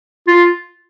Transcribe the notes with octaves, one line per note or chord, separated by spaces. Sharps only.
F4